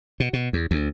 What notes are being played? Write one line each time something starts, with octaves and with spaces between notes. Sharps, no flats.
B2
B2
E2
D2